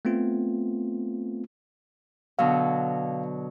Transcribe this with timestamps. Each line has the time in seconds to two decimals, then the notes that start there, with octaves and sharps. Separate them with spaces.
0.05 A3 B3 C4 F4
2.39 B2 D3 F#3 F5